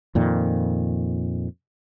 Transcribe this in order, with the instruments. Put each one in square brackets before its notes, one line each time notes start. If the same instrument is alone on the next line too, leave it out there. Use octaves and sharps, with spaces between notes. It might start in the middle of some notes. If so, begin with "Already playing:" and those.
[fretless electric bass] F2 A#2 D#3